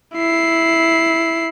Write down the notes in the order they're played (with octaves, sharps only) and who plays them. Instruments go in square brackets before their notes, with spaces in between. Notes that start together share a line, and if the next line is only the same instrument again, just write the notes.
[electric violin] E4 C7